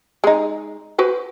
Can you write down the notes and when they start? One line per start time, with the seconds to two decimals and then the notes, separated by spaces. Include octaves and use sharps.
0.24 G#3 D#4
0.98 F#4 B4 C5